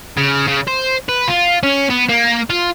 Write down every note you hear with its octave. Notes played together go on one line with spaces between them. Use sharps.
C#3
C#3
C5
B4
F4
C#4
B3
A#3
F4